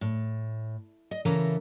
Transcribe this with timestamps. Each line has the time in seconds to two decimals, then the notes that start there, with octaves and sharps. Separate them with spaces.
0.01 A2
1.11 D#5
1.25 C#3 E3 A4 A#4 E5 A#5